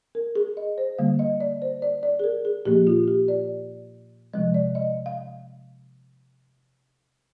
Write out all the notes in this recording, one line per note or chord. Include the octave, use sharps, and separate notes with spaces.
A#4
G#4
D#5
C5
D3 G3 A#3 F5
D#5
D5
C5
D5
D5
G#4
A#4
G#4
A#2 F3 A#3 G4
F4
G4
D5
C3 F3 G#3 D#5
D5
D#5
F5